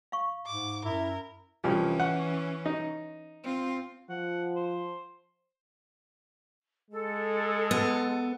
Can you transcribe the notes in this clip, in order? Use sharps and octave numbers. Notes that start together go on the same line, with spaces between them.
F5 C#6
G#2 D6
F#2 E4 A#4
C2 E3 F3 C#4
F#5
D#4
C4 F4
F3 F#5
C5
G#3 A4
B3